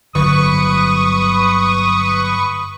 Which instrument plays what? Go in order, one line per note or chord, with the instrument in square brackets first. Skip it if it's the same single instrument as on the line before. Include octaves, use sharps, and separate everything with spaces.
[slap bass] G1 D3 F#3 [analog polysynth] B4 C#6 [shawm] D#6